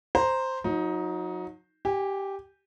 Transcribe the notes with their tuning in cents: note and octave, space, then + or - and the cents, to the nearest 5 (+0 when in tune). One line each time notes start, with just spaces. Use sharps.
C5 +0 A#5 +0
F#3 -30 D#4 +15
G4 -5 G#5 -30